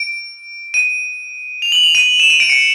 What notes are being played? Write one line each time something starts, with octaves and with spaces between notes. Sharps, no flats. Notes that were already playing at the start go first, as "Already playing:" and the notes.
Already playing: D7
D#7
F7
F#7
F7
D#7
E7
D#7
D7
C#7